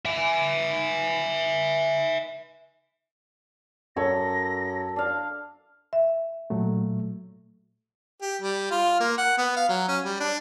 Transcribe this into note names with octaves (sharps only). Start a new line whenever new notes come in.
E5 G#5
F#2 A4 C#5 A#6
D4 F5
E5
A#2 F#3 A3
G4
G3
F4
A#3
F#5
B3
F5
F#3
C#4
G3
D4